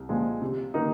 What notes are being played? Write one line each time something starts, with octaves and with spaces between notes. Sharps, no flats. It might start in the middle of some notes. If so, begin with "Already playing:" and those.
Already playing: C2
A#2 F3 G#3
C3
D#3 A#3 D#4